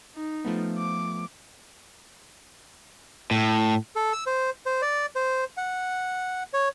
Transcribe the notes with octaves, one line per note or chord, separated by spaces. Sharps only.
D#4
F3 A3 B3
D6
A2
A4
E6
C5
C5
D5
C5
F#5
C#5